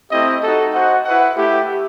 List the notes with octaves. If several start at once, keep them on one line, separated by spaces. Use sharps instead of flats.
A3 C4 E4 G4 D#5
D#4 F#4 A4
F#4 C5 D#5 F#5
E4 B4 F#5
A3 E4 G4